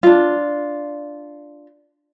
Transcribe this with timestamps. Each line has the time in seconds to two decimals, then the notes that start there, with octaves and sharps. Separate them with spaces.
0.03 D4 F4